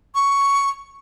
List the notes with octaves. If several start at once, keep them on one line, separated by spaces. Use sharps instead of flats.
C#6